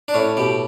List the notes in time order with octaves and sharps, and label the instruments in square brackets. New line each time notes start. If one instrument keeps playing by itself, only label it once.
[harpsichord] D4
A2 C#4
B2 G4